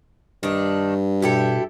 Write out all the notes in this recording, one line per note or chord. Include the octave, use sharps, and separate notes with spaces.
G2 D#3 D4
B2 E4 G4 A4